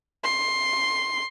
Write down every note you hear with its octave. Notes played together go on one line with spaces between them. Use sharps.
C6